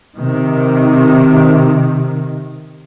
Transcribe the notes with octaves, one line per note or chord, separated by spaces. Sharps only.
C3 D#3